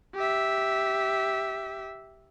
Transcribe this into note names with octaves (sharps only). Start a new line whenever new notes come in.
G4 E5